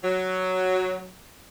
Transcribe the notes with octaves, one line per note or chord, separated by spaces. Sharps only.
F#3